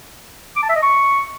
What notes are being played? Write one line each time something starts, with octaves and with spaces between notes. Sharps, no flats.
D6
A5
E5
D#5
C#6